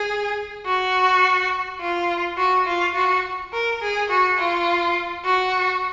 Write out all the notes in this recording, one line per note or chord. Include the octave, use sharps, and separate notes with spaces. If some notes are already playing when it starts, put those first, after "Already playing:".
Already playing: G#4
F#4
F4
F#4
F4
F#4
A#4
G#4
F#4
F4
F#4